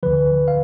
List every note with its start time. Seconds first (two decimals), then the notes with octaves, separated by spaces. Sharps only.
0.03 D2 D3 F3 B4
0.48 F5